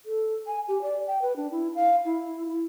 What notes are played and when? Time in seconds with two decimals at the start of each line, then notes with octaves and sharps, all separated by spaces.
0.05 A4
0.47 G#5
0.68 G4
0.82 D5
1.07 G5
1.22 B4
1.36 D4
1.51 E4
1.75 F5
2.05 E4
2.48 E4